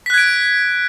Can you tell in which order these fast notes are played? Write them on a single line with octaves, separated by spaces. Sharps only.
B6 F#6 G#6 D7